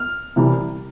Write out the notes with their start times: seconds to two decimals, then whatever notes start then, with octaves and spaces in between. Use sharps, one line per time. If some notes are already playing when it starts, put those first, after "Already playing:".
Already playing: F6
0.36 C2 C3 E3 G3